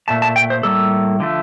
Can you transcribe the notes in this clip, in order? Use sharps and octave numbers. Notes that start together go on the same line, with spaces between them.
A#2 A3 A5
A5
G5
C5
A2 G3 A#3 A4
D3 F3 A3